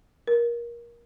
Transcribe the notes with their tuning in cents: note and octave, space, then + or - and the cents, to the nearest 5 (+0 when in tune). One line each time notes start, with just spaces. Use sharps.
A#4 +20